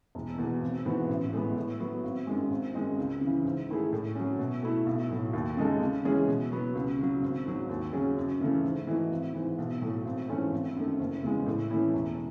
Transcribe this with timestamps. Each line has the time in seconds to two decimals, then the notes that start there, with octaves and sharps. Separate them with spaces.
0.15 E1
0.38 E2 B2
0.62 G#1
0.85 G#2 E3 B3 F#4
1.09 A1
1.33 A2 G#3 B3
1.56 A2
1.80 F#3 B3
2.03 G#1
2.27 F#2 D#3 G#3
2.50 G#1
2.74 F#2 D#3 G#3 D#4
2.98 C#2
3.21 C#3 E3
3.45 G#2
3.69 D#3 A3 E4 G#4
3.93 A2
4.15 F#3 C#4
4.39 B2
4.62 A3 E4
4.86 B1
5.11 A2 F#3
5.33 D#2
5.57 C#3 G#3 D#4 A4
5.81 C#3
6.04 E3 G#3 C#4 G#4
6.28 B2
6.52 F#3 B3
6.75 C#2
6.99 C#3 F#3
7.22 G#1
7.46 G#2 F#3
7.69 D#2
7.93 C#3 F#3 C#4 G#4
8.17 F#2
8.41 C#3 E3 A3
8.64 G#2
8.87 E3 A3 D#4 F#4
9.11 G#1
9.34 G#2 E3
9.58 B1
9.81 A2 F#3 A3
10.05 G#1
10.29 G#2 E3 A3 C#4
10.52 G#1
10.76 F#2 D#3 A3
11.00 F#1
11.23 E2 C#3 G#3
11.46 A2
11.70 E3 A3 C#4 E4
11.94 E1